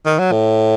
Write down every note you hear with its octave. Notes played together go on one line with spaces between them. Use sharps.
D#3
F#3
A2